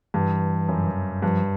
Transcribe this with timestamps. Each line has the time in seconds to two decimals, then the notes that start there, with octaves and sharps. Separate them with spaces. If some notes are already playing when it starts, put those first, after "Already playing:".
0.14 G2 E3
0.69 F#2
1.22 G2 F3